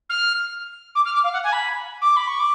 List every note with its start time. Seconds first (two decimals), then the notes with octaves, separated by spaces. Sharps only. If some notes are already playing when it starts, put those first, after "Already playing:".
0.09 F6
0.95 D6
1.05 F6
1.14 D6
1.24 F5
1.33 F#5
1.44 G#5
1.52 B5
2.01 D6
2.16 B5
2.27 C#6
2.39 D6